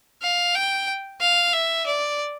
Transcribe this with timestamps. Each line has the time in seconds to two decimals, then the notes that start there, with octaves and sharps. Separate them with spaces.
0.22 F5
0.54 G5
1.21 F5
1.53 E5
1.86 D5